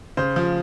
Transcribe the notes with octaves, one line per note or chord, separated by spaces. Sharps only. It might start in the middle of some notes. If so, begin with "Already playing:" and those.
C#3 C5
F3